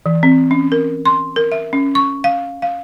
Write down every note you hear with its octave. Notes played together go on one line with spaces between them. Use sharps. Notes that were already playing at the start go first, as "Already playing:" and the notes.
E3
C4
C#4
A#4
C6
A#4
E5
C#4
C#6
F5
F5